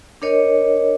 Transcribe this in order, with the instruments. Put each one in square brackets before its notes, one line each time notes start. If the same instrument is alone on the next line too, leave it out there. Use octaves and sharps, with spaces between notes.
[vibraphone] D4 A#4 C#5 D#5